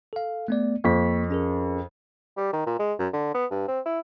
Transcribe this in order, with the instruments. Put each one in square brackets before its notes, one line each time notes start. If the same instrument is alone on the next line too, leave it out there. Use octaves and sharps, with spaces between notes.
[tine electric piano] A4 F5
A3 B3 D5
[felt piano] F2 [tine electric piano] A#3 C#6 B6
[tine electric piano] C#4 G#4 A#4
[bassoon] G3
D#3
A#2
G#3
F#2
D3
B3
G2
C4
E4